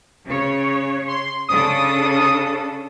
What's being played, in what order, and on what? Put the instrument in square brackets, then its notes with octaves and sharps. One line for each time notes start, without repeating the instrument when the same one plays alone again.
[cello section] C#3 C#5
[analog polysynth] C6
[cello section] C#3 D4 A4 [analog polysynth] D#6